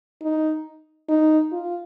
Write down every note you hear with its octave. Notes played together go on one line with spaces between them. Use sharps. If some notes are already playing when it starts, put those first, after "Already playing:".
D#4
D#4
F4